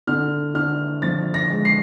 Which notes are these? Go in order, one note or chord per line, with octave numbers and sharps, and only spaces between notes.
D3 F6
D3 F6
F3 A6
A#6
G#3
C7